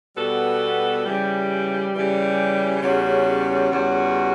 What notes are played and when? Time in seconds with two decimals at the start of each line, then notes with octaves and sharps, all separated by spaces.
0.16 B2 G3 B3 F#4 A4
1.05 C#3 E3 G3
1.94 C#3 E3 G3
2.82 E2 C#3 G3 C#4 F#4
3.71 E2 C#3 G3 C#4 F#4